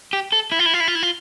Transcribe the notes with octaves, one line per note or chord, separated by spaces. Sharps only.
G4
A4
E4
F4
E4
F4
E4
F4
E4
F4